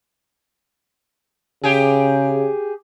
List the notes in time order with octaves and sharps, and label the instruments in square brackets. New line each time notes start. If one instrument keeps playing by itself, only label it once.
[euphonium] C#3 [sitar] G4 G#4